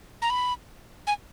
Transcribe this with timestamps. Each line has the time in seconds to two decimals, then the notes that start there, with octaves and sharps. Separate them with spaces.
0.22 A#5
0.30 B5
1.07 G#5